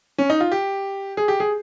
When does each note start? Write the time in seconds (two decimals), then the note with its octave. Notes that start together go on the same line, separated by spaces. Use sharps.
0.18 C#4
0.30 D#4
0.40 F4
0.52 G4
1.17 G#4
1.28 G4
1.40 G#4